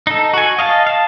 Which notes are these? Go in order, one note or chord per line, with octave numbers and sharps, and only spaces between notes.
D#4 A4
F#4 G#5
D#5 F5 G#5 A5
F5 A5